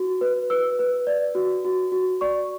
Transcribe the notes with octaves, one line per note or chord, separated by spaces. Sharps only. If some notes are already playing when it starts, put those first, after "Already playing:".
Already playing: F#4
B4
B4 E6
B4
D5
F#4
F#4
F#4
D5 C#6